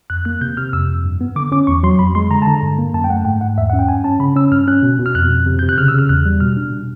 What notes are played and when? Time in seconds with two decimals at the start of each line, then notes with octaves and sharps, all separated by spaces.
0.10 F2 F#6
0.25 A#3 F#6
0.41 C3 G6
0.57 C3 F6
0.73 F2 E6
0.88 F2
1.04 G2
1.21 B3
1.36 D3 D6
1.52 C#4 D6
1.67 E2 C#6
1.83 F#3 C6
1.99 F2 B5
2.15 G#3 C6
2.30 D3 A#5
2.42 A5
2.46 D3 A#5
2.63 G2
2.78 A#3
2.94 F#2 A5
3.04 G5
3.10 A3 F#5
3.25 G#2 G5
3.41 G#2 F#5
3.58 E2 E5
3.70 C#4 F#5
3.79 G5
3.88 G2 G#5
4.04 C#4 A5
4.20 C#3 B5
4.36 C#4 E6
4.52 G2 F6
4.68 C#4 F#6
4.83 B2
4.99 B2
5.06 F6
5.15 F2 F#6
5.31 F2
5.46 C3
5.59 C3 G6
5.69 F#6
5.78 C#3 F6
5.88 E6
5.94 C#3 F6
6.09 E2 F#6
6.25 G3
6.40 B2 F6
6.57 D4
6.73 B2